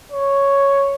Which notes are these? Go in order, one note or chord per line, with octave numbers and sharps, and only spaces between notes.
C#5